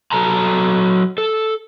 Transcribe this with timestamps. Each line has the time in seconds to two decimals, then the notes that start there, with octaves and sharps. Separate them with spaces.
0.12 F#3 A4 A5 A#5
1.18 A4